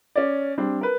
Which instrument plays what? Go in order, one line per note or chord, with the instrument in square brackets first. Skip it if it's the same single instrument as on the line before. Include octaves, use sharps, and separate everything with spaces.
[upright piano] C#4 D5
G3 C4 D4
A#4 B4